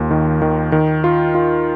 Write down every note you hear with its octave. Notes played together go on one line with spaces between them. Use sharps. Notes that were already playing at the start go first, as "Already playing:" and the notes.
Already playing: D#2 F4
D#3
D#3
D#3
F4
F4